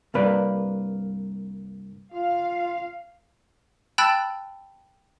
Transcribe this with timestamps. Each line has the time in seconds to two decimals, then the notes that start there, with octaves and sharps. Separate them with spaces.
0.14 C2 G2 A#3 B4 D5
2.14 F4 F5
3.98 G5 A5 B5 E6 F#6 A6